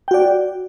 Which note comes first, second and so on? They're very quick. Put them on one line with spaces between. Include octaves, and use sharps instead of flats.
G5 F#4 D5